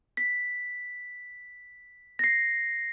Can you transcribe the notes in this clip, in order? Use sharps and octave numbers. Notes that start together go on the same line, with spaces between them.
B6
A#6 C7